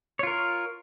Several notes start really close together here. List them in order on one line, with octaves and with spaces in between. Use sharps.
C#5 F4 A#4